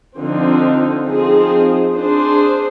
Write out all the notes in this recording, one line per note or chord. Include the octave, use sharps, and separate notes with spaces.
D3 F3 C4 D#4
F3 C4 D#4 G#4
D4 G#4 C5